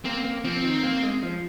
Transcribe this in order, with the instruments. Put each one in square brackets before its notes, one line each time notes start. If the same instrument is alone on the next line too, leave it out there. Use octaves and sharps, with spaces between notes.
[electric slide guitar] A#3 [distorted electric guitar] C4
[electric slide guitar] A#3
[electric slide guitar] F3 [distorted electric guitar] C4
[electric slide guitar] D#3
A#3
G#3
F3